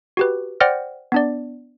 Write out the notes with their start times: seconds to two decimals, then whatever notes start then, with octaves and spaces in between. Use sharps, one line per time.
0.17 F#4 G4 B4
0.60 C5 D5 F#5 G5 F6 A#6
1.12 B3 D4 D5